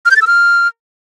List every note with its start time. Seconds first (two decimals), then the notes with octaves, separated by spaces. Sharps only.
0.06 F6
0.11 G6
0.16 A6
0.22 E6
0.27 F6